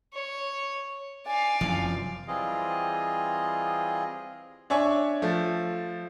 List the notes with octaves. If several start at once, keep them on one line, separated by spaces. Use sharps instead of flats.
C#5
D5 F5 G#5
F1 F#2 E3 F3
E3 G3 C4 F4 G#4 D#5
D4 C#5 E5 G#5 C#6
F3 A3 A4